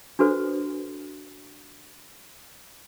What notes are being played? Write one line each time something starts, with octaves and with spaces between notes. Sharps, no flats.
D4 F#4 A4 B4 C5